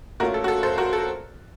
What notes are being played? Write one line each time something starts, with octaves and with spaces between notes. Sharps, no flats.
A#2 A3 C#4 F4 F#4 A#4
A4
F#4
A4
A4 C5
F#4 A#4
A4